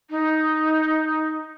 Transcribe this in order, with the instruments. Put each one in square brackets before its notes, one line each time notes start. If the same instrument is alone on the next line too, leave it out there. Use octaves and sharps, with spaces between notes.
[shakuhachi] D#4